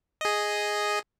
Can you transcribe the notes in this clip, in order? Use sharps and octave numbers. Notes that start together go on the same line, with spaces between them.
G#4 D#5